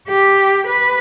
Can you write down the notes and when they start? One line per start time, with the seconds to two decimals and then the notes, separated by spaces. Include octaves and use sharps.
0.08 G4
0.67 B4